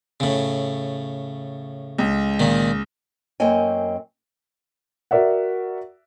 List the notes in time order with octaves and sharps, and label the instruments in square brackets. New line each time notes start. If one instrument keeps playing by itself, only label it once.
[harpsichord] A2 C#3
[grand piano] C#2
[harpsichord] A#2 D#3
[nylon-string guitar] F#2 A#3 C4 C#5 D#5 G#5
[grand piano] F#4 A#4 D5 E5 F#5